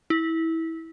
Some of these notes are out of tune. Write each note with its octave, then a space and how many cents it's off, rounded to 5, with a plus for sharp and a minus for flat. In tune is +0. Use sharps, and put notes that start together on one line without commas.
E4 -20